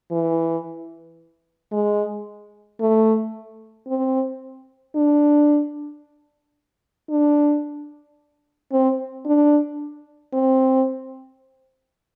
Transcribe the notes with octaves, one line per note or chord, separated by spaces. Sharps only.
E3
G#3
A3
C4
D4
D4
C4
D4
C4